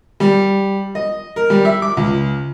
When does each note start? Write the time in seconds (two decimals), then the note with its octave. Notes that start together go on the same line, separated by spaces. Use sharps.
0.20 G3
0.95 D#5
1.36 A#4
1.50 G3
1.65 E5
1.82 D6
1.97 C#2